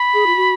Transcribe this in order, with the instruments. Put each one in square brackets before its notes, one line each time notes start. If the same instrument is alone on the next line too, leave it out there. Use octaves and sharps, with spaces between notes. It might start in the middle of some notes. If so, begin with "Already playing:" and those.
Already playing: [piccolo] B5
[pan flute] G#4
F4
F#4